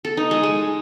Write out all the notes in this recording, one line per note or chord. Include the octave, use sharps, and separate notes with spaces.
A4
D#4
G#3
G#3